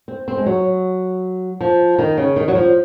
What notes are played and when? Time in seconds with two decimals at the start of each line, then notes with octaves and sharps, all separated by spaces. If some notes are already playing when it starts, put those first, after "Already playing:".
0.08 C4
0.28 C4
0.37 G#3
0.46 F#3
1.61 F3
1.98 D#3
2.17 C#3
2.36 D#3
2.48 F#3
2.55 F3